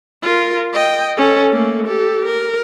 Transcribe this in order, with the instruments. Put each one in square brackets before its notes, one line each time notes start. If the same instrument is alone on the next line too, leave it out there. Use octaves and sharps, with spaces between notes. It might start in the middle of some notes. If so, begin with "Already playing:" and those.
[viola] F4 A#4
D#5 G5
C#4 A4
A3 A#3
G4 A4
A#4